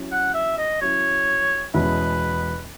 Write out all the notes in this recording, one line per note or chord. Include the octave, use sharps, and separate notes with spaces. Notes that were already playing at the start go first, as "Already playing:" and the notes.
Already playing: F#3 C#4 E4
F#5
E5
D#5
F#3 C#4 E4 C#5
E2 B2 G#3 C#4 E4 B4